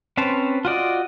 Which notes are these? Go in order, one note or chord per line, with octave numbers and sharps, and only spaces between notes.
C4 C#4 B4 C5 A5
F4 F#4 D5 D#5